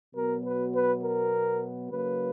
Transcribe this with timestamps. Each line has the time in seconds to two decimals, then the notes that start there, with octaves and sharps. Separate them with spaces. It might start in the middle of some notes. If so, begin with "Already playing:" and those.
0.15 B2 F#3 B3 A#4
0.44 B4
0.73 B4
1.03 A#4
1.90 C#3 F#3 A#3 B4